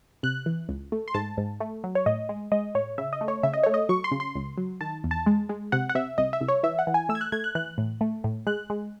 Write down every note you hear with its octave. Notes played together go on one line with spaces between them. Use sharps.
C3 F#6
E3
C#2
A3
C6
G#2 A5
G#2
A3
F#3
C#5
A2 D#5
G#3
G#3 D#5
A2 C#5
C#3 E5
D#5
A3
C#5
C#3 E5
D#5
A3 C#5
D#5
F#3 C#6
C6
C#3
C6
C#2
F#3
D#3 A5
E2
A5
G#3
G#3
C3 F#5
F#5
C3 E5
C2 D#5
E5
C2
C#5
E3 E5
F#5
E3
G#5
A3 E6
G#6
F#6
A3 G#6
F#6
E3 F#6
A2
A3
A2
G#3 F#6
G#3